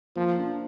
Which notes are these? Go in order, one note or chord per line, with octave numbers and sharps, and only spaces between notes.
F3 A#3
D4